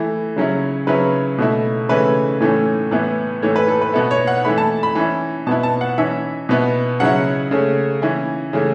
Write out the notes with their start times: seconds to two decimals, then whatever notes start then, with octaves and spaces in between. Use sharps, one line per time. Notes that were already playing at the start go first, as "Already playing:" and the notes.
Already playing: E3 A3 E4
0.36 C#3 F#3 C#4 E4
0.87 C#3 F#3 C#4 E4 B4
1.38 B2 A3 E4
1.89 C#3 E3 A3 C#4 E4 B4
2.40 A2 E3 A3 C#4
2.91 A2 E3 B3 E4
3.42 A2 E3 A3 C#5
3.56 B4
3.68 A4
3.81 B4
3.93 B2 B3 E4 A4
4.11 C#5
4.27 F#5
4.45 E3 A3 E4 B5
4.58 A5
4.83 B5
4.95 E3 C#4 E4
5.47 B2 B3 E4 A5
5.63 A5
5.81 F#5
5.98 E3 C#4 E4 E5
6.49 B2 B3 E4
7.00 C#3 F#3 C#4 E4 F#5
7.51 C#3 A3 C#4
8.02 E3 C#4 E4
8.53 C#3 E3 A3